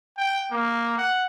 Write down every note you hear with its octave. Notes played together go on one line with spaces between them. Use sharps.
G5
A#3
F#5